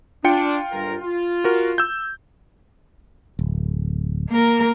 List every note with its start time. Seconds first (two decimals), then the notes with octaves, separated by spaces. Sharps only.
0.24 D4 F4 G5 C#7
0.72 G1 A#4
1.02 F4
1.44 F#4 A#4
1.78 E6 G6
3.39 D1
4.30 A#3 A#4